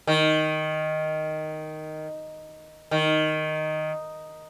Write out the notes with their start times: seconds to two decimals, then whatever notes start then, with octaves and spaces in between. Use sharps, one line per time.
0.07 D#3
2.91 D#3